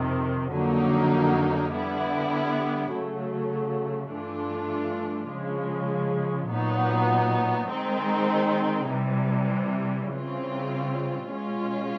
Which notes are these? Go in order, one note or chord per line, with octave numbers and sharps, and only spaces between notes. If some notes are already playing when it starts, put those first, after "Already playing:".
Already playing: F2 C3 D#3
F2 D3 F#3 A#3 D#4
D3 G3 B3 E4
C#3 F#3 A3
G2 E3 A3 D4 F4
C#3 F3 G#3
A#2 F#3 B3 D#4
D#3 G#3 C4 D#4
C3 E3 G3
C#3 E3 G3 C4 F4
B2 G#3 C#4 F4